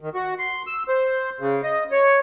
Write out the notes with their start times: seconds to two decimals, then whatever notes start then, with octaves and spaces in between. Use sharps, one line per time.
0.01 D#3
0.14 F#4
0.39 C6
0.67 E6
0.88 C5
1.40 C#3
1.63 D#5
1.92 C#5